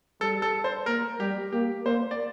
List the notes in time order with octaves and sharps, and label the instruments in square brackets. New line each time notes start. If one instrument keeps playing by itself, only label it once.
[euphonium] G3 [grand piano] A4
[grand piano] A4
C5
[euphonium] A#3 [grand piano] A#4
[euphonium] G3 [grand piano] G4
[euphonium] A#3 [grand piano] G4
[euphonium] A#3 [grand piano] C5
[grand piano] D5